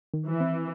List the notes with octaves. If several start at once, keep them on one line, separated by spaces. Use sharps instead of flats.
D#3
E3
C4